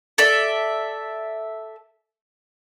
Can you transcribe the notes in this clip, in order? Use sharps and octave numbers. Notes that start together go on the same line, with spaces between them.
A4 D5 E5